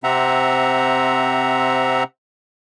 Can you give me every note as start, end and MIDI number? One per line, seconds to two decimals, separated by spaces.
0.04 2.03 48
0.04 2.03 60
0.04 2.03 76
0.04 2.03 78
0.04 2.03 82